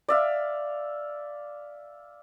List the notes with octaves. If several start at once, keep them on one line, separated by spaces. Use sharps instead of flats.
D5 E5 F5